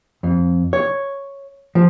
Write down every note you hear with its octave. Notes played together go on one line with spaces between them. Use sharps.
F2
C#5
F3